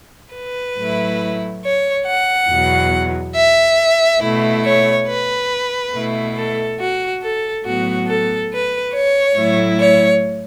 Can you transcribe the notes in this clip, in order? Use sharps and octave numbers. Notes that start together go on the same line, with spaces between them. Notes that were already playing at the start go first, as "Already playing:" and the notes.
B4
A2 F#3 A3 E4
C#5
F#5
E2 B2 F#3
E5
B2 A3 E4
C#5
B4
B2 A3 E4
A4
F#4
A4
A2 F#3 B3 F#4
A4
B4
C#5
A2 F#3 A3 E4
C#5